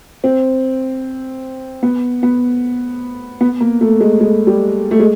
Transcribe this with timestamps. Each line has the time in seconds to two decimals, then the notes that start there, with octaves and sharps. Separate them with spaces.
0.24 C4
1.83 B3
2.23 B3
3.41 B3
3.60 A#3
3.81 A3
4.01 G#3
4.21 G#3
4.47 G3
4.91 A3
5.00 G#3